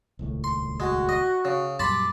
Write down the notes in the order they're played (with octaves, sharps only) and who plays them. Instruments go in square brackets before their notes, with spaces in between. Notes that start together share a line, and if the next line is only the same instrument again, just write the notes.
[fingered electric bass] D#1 C#2 A2
[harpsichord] C6
[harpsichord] G#3 [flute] F#4
[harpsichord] D#5
C#3
[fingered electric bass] F#2 A#2 G3 [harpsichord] A5 B5 C6 [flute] D6